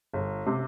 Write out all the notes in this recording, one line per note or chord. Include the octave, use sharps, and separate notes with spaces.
G1
C3